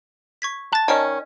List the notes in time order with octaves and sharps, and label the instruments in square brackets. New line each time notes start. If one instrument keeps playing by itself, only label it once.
[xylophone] C#6 G#6 B6
[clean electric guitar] A5 [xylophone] F#6 A6
[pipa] D#3 C#4 [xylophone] D5 D#5 C#6